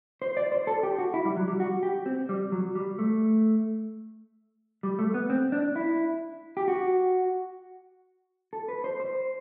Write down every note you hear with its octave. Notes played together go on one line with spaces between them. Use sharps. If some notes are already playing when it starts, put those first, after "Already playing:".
C5
D5
C5
A4
G4
F#4
E4
G3
F#3
G3
F#4
G4
C4
G3
F#3
G3
A3
G3
A3
B3
C4
D4
E4
G4
F#4
A4
B4
C5
C5